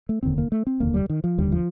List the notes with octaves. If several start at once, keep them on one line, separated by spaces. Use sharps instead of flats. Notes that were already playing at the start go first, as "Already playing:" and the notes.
A3
F1 D#2 D3 C4
A#3
A3
C4
F1 D#2 D3 A#3
G3
D#3
F3
F1 D#2 D3 G3
F3